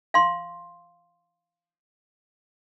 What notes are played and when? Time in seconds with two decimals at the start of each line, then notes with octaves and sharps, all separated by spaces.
0.14 F5 C6